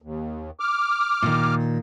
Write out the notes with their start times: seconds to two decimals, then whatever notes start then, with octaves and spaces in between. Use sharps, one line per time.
0.02 D#2
0.60 D6 F6
1.22 A#2 D#3